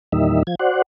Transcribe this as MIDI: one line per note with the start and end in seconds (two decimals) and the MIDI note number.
0.12 0.43 40
0.12 0.43 46
0.12 0.43 51
0.12 0.43 55
0.12 0.43 63
0.12 0.43 76
0.47 0.55 53
0.47 0.55 92
0.60 0.82 66
0.60 0.82 72
0.60 0.82 74
0.60 0.82 78